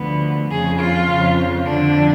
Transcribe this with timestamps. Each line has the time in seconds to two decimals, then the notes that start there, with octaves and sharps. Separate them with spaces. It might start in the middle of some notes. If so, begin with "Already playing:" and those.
Already playing: D2 D3 F3 B3
0.51 F2 C#3 F3 G#4
0.80 F4
1.08 F2 C#3 F3
1.66 F2 D3 F3 D4